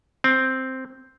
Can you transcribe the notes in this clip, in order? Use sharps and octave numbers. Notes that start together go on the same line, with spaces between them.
C4